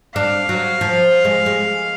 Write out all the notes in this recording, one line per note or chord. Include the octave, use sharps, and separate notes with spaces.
D4 F5
F#3
F3
G#3
G#3